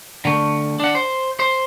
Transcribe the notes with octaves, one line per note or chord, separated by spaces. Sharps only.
D3 A3
D4 F#5
C5
C5